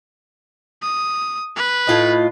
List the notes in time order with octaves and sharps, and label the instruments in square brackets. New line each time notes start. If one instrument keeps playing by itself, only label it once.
[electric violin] D#6
B4
[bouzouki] A2 F4 D#5